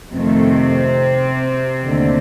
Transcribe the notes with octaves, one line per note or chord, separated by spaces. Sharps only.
F2 C3 D#3 A3 C4
D#2 D3 A3